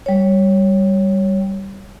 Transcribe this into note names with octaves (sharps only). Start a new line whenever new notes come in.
G3 C#5